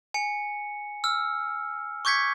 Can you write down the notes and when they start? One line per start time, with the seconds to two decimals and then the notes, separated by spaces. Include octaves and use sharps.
0.14 G#5 C#7
1.04 E6 F6
2.05 C#6 D6 G6 G#6 B6 C#7